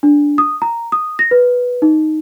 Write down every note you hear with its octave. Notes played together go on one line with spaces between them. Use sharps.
D4
D#6
A#5
D#6
A#6
B4
D#4